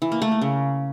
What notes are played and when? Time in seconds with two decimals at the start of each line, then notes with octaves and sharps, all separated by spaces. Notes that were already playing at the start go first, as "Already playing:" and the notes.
0.02 E3
0.12 A#3
0.22 A3
0.32 A#3
0.42 C#3